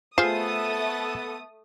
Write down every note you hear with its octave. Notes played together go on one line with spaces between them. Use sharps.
A3 B3 F4 G#4 A4 C5 D#6